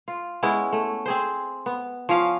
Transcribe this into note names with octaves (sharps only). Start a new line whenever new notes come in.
F4
G#3 B3 C#4 E4
A3
C4 G#4 C5
B3
F3 C#4 F5